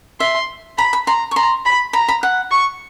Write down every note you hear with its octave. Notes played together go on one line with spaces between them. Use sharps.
E5 C6
A#5 B5
B5
A#5 C6
C#6
A#5 C6
B5
A#5 B5
B5
F#5
C#6